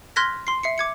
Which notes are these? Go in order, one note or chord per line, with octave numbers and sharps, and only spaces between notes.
C6 F6 F#6 G#6 A#6 B6
C6 C7
E5 C7 C#7
D6 G#6 C#7